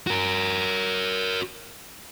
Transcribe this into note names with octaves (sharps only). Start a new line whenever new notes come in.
F#4 A#4